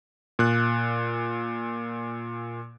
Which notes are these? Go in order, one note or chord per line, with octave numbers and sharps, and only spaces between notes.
A#2 F#6